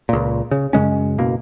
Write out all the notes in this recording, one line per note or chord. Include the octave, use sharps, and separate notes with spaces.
C#2 A#2
C#3
F#2 C#3 G#3 C#4
F#1 B2 A#3